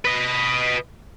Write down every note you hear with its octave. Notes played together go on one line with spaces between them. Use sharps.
B4 D#5